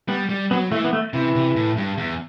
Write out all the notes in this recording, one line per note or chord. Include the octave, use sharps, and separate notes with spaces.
G3 B3
G3
F#3 B3
E3 A3
B3
A3
C3 E3
C3
A2
G2
E2